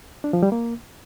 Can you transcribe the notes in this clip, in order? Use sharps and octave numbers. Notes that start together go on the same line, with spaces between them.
D4
F3
G3
A#3